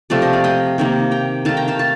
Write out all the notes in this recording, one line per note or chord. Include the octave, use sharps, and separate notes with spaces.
C3 F3 A3 D5 F5
C5 D#5
D5 F5
D#5 G5
C3 D#3 A#3
G5 A#5
D#3 A3 F5 A5
G5 A#5
F5 A5
F5 A5